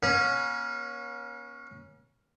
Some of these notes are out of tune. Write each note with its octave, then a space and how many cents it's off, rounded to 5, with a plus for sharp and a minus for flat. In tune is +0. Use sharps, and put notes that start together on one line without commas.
A#3 +45 C#4 +0